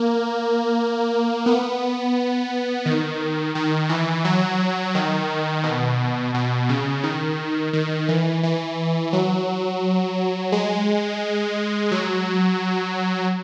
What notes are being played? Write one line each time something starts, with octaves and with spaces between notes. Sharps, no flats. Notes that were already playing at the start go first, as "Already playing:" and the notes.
Already playing: A#3
B3
D#3
D#3
E3
F#3
D#3
B2
B2
C#3
D#3
D#3
E3
E3
F#3
G#3
F#3